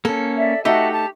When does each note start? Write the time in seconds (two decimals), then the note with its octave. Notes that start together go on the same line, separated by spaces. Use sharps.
0.05 A#3 C#4 A4
0.38 D5 E5
0.65 A3 D#4 F#4 G4 E5 A5
0.92 A5